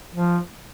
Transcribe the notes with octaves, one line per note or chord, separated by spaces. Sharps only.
F3